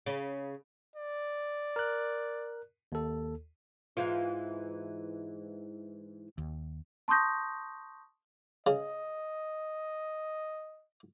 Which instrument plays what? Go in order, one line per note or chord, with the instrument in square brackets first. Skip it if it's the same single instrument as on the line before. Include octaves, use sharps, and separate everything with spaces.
[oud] C#3
[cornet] D5
[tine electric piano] A#4 F#6
D#2 A4
[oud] G#2 E3 F4
[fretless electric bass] D#2
[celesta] A5 C6 C#6 D#6 G6 A#6
[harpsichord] C#3 [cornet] D#5